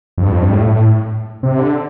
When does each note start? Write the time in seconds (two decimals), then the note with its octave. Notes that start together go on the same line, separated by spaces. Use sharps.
0.18 F2
0.22 G2
0.32 F2
0.42 G2
0.52 A2
0.67 A2
1.43 C3
1.59 D3